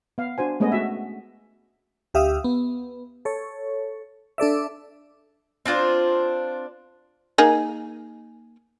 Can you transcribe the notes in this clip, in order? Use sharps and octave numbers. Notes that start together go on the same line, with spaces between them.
B3 F5
D4 F#4 C5 G#5
G#3 A3 B3 C#4 G#4 D#5
F#4 E5
D2 G4 E5 F5 D#6
B3
A4 C#5
D4 A4 D5 E5
C4 D4 F4 C5
A#3 D#4 G#4